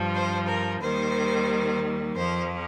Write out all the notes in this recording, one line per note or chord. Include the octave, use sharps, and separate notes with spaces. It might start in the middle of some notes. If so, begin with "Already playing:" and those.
Already playing: G2 F3
C5
A#4
D#2 D#3 G3 C5
F2 F3 C5